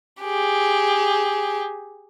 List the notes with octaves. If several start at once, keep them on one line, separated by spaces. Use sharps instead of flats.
G4 G#4